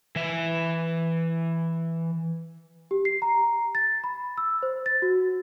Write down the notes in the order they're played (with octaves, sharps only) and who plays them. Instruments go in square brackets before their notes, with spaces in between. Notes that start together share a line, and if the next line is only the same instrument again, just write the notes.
[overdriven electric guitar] E3 E5
[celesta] G4
C7
A#5
A6
B5
E6
C5
A6
F#4